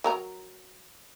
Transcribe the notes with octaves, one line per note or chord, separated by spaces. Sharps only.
F#3 A#4 A#5